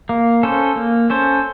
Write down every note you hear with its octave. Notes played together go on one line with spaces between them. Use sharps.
A#3
C#4 A4 C5
A#3
C#4 A4 C5